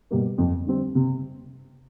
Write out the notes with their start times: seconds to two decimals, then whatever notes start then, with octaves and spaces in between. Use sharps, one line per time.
0.11 B2 G3 A#3
0.38 F2
0.66 D3 G3 C4
0.95 C3